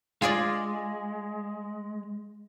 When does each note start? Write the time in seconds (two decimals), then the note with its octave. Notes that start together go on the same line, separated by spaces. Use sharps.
0.22 G#3 F4 G#4 D5